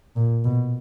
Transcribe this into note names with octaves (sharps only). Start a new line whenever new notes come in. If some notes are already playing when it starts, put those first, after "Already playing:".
A#2
B2